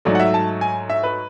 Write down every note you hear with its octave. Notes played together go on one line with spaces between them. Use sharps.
G#2 F#3 A3 D5
F#5
E5
A5
G#5
E5
B4